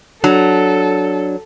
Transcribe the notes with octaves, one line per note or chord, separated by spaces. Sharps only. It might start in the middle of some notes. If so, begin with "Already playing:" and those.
F#3 D4 A4